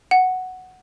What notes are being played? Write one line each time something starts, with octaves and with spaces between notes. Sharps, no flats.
F#5